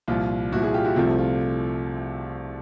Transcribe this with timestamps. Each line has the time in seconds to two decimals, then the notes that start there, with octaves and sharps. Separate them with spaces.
0.08 C2 A#2 F3 F4
0.52 C2 A#2 F3 E4 F#4
0.63 F#4 G#4
0.74 F4 G4
0.85 E4 F#4
0.96 C2 C3 F3 A3 C4 F4
1.18 F4